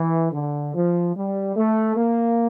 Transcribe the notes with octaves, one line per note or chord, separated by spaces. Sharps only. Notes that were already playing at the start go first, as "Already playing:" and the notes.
Already playing: E3
D3
F3
G3
A3
A#3